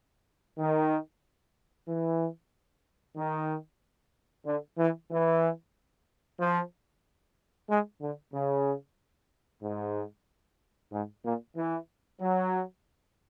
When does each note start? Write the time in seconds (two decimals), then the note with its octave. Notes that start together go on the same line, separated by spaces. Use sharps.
0.58 D#3
1.88 E3
3.16 D#3
4.46 D3
4.79 E3
5.10 E3
6.40 F3
7.69 G#3
8.01 D3
8.34 C#3
9.62 G#2
10.92 G#2
11.24 A#2
11.57 E3
12.21 F#3